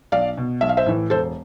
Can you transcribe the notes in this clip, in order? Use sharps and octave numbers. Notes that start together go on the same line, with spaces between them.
B1 D5 F5
B2
B1 E5
F5
C5 E5
A2 E3
E1 A4 C5